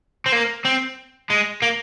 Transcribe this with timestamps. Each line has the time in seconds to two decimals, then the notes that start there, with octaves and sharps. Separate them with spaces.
0.26 C4
0.32 A#3
0.65 C4
1.30 G#3
1.62 A#3